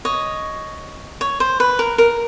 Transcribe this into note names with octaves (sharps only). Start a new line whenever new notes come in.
C#5 D#5
C#5
C5
B4
A#4
A#4